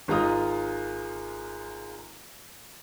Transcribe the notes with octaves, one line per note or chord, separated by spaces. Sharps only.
G#1 G#3 F4 A#5 D#6